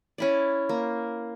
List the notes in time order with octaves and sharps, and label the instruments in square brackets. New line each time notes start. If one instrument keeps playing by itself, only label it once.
[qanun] C#4 E4 D5
A#3